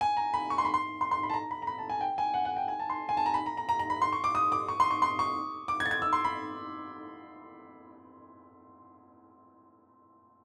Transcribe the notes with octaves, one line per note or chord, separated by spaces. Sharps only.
G#5
A#5
B5
C#6
C6
B5
C6
C6
C6
B5
A5
A#5
B5
A#5
B5
A5
G#5
G5
G#5
F#5
F#5
G5
G#5
A5
C6
G#5
A5
A#5
B5
A#5
A#5
A#5
A#5
B5
C6
C#6
D6
D#6
D6
C#6
C6
C#6
C6
C#6
D6
G#6
A6
G#6
E6
C6
B5